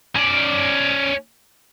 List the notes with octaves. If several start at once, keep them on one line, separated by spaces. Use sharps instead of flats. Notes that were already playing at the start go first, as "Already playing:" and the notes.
C#4 D5